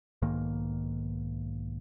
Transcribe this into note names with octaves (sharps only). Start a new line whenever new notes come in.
B1 G#2 D#3 A#3